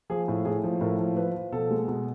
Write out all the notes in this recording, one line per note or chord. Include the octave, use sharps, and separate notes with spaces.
F3 G#4
A2
A2 G#4
F3
A2 A#4
F3
F3 B4
F3
B2 A4
G#3
B2